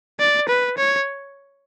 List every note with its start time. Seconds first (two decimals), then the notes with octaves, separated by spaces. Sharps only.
0.19 D5
0.48 B4
0.77 C#5